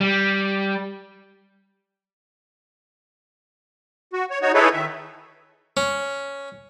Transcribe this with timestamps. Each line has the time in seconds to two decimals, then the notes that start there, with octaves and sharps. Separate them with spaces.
0.01 G3
4.13 F#4
4.30 C#5
4.42 D#4 F#4 C#5
4.54 D#4 E4 G#4 A4 B4 C#5
4.73 D#3 E5
5.77 C#4